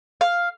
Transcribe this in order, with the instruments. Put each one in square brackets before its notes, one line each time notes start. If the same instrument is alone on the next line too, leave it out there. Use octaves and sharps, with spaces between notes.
[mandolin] F5